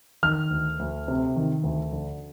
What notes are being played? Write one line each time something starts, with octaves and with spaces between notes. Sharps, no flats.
D#3 F6
D2
D2
C3
D#3
D2
D3